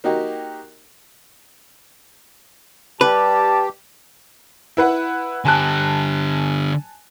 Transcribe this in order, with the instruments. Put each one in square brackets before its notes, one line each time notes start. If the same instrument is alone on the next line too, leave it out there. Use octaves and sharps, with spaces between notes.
[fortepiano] A#3 D#4 F#4 G4
[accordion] G3 G4 [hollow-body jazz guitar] B4 [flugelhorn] A5
[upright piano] E4 B4 F#5
[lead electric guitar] D3 G4 [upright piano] G#5 A5 F#6